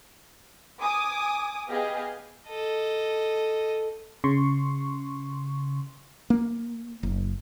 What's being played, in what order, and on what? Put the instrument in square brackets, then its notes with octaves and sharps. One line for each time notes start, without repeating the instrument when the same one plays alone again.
[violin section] G#5 D6 D#6
B3 G4 G#4 D#5 F5
[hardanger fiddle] A4 D#5
[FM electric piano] C#3 C6 C#6
[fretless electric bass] A#3
F#1